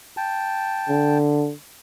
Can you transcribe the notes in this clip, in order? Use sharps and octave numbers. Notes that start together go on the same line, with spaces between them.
G5 A5
D3